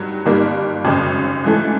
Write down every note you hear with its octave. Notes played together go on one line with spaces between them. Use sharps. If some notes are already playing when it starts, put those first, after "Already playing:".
Already playing: G2 D#3 F#3
G1 G2 D#3 G3 A#3
G#1 F#2 C#3
G#2 E3 A3